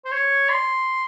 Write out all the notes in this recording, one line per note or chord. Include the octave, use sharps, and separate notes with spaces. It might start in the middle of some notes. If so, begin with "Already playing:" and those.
C5
C#5
C6